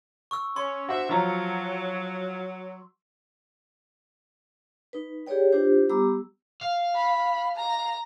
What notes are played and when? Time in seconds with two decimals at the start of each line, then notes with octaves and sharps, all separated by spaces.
0.31 C#6 E6
0.56 C#4 C6
0.89 D4 F#4 C5 E5
1.09 F3 F#3 A#5
4.93 D#4 B4
5.27 G4 G#4 B4 C#5 D5 G5
5.52 D4 E4 F4 G4 C5
5.89 G3 B3 G4 A#5 D6 E6
6.61 F5
6.95 B5
7.56 A#5